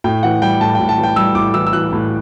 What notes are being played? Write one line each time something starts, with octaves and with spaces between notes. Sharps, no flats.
A2 G5
E3 F#5
G3 G5
A2 A5
A2 G5
A5
E3
G5
G3 E6
A2 D6
E3 E6
E6
E3 F#6
A2